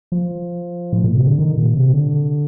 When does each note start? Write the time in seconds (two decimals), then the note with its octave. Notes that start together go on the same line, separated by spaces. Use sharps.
0.12 F3
0.93 A2
1.04 A#2
1.16 C3
1.27 D3
1.39 D#3
1.57 A#2
1.75 C3
1.94 D3